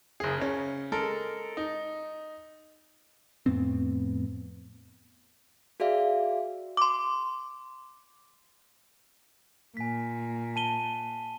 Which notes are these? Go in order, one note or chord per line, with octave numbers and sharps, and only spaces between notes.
F#1 G#4
C#3 C#4
G#3 A4 A#4
D#4
F2 A2 B3 C4
F#4 G#4 D5 E5 F5
C6 D6
A#2 G#5 B6
A5 D#7 G7